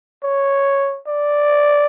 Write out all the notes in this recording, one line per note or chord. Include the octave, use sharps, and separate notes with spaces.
C#5
D5